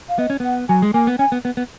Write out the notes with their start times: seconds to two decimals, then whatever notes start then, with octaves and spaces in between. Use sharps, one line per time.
0.09 F5
0.18 B3 D#5
0.30 C#4
0.40 B3 F#5
0.69 F#3 G#5
0.82 G#3
0.94 A#3 G#5
1.07 B3
1.18 C#4 G#5
1.32 B3
1.45 B3
1.57 B3